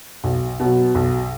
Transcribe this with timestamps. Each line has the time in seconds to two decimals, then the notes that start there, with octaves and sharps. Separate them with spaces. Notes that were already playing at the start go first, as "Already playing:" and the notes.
0.24 B1
0.60 B2 F#3
0.95 B1